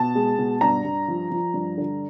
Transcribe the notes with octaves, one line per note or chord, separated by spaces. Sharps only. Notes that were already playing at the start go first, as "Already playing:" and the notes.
Already playing: B2 A5
G#3
B2
G2 A#5
G2
F3
F3
G2
D3